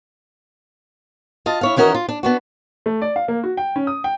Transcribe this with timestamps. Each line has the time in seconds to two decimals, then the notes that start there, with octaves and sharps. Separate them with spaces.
1.46 F4 D#5 A5
1.61 E4 C#5 F5
1.76 D#3 E3 C#4 F#4 A#4 D#5
1.94 F4
2.09 D4
2.23 B3 D4 F#4
2.86 A3
3.02 D5
3.16 F5
3.28 A#3
3.44 F#4
3.57 G5
3.76 C#4
3.87 D#6
4.04 G5